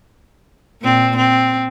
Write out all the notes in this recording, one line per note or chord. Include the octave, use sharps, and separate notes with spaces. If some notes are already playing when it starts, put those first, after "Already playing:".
A#2 C4
C4